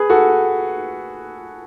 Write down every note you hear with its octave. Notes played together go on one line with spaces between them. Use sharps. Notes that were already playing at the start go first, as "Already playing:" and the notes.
Already playing: G#4 B4
F#4 A4